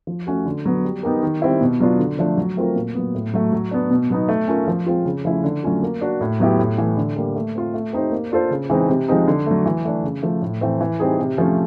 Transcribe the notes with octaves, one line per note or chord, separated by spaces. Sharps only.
F3
A3 C#4 F#4
D3
F#3 B3
G3
B3 D#4 G4 A#4
D#3
G3 C4 E4
B2
F#3 B3 D4 F4
D3
F3 A3 D4
F#3
A3 C4 F4 A#4
A#2
F#3 B3
A2
F#3 A3
F#3
B3 D4
B2
F#3 B3 D#4
A3
C#4 F4 A#4
F3
G#3 C4 F4
C#3
F3 A3 C#4 E4
D3
F#3 A3 C#4 F4
A#3
D4 F#4
A2
F#3 B3 E4 G4
A2
E3 A3
D3
G3 A#3
A3
C4 F4
A3
C4 D#4 G4 C5
A#3
D4 F4 A4 C5
C#3
E3 G#3 C4 D#4
C3
F3 G#3 C4 D#4
D3
F#3 A3
E3
A3 D4
C#3
F3 A3
A2
E3 A3 C4
E3
G3 C4 D#4 G#4
C3
F3 A3 C#4